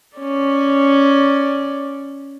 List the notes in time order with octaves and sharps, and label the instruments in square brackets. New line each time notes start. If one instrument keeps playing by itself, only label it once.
[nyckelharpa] C#4 D5